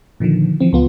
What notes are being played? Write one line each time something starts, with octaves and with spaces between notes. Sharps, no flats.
A#2 D3 D#3 F3
E3 F3 C4
C#2 B3 F4